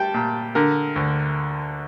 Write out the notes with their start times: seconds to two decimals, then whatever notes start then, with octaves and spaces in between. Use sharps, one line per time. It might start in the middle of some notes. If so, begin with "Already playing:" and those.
Already playing: G3 G5 A5
0.14 A#2
0.55 D3 A#4
0.96 D2